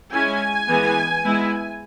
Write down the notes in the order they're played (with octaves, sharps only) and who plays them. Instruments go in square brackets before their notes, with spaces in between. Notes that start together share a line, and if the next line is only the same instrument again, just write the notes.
[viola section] G#3 C#4 E4 G#5
E3 G#3 B3
G#3 B3 E4